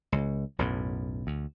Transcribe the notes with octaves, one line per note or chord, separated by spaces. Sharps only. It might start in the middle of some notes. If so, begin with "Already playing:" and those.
C#2
B1 F#2 A2
D2